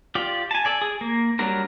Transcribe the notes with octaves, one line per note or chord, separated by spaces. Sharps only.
F4 G4 D5
G#5 A5
A4 D5 G#5
G#4
A#3
F#3 G3 D4 A#4